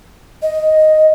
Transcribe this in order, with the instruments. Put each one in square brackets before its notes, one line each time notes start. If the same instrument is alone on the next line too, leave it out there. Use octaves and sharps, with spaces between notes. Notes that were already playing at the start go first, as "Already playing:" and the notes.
[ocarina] D#5